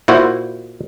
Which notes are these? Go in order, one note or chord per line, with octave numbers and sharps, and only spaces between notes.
A#2 E4 F#4 C5